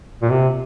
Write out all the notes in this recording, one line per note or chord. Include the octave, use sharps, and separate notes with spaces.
A#2
C3